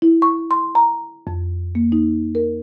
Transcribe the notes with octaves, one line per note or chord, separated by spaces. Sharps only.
E4
C#6
C6
A#5
F2
A#3
D#4
A#4